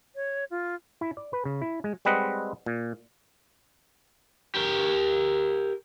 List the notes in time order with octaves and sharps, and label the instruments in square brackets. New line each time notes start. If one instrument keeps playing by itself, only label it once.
[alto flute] C#5
F4
[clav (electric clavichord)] E4
D5
B4
C#3
E4
G#3
G3 G#3 C4 B4 D#5 F#5
A#2
[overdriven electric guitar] G4 A#4